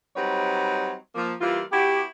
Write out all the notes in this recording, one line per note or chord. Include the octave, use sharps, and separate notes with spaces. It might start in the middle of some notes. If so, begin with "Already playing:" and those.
F#3 G3 C4 D#4 B4 C#5
F3 A#3
E3 G3 A#3 F4
B3 E4 F#4 G4